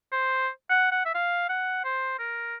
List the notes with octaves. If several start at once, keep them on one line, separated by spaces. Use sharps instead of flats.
C5
F#5
F#5
E5
F5
F#5
C5
A#4